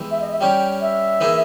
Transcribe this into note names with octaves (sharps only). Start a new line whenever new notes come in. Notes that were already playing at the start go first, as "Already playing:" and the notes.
Already playing: E3 G#3 B3 G4
E5
D#5
E5
G3 C#4 G4 G5
E5
E3 A#3 D#4 G#4